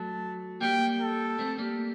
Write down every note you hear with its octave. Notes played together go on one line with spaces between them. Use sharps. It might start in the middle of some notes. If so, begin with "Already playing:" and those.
Already playing: F#3 A3 A5
G3 A#3 G5
A4
A3 C4
G3 A#3